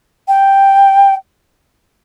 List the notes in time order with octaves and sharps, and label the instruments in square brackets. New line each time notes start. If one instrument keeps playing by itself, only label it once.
[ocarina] G5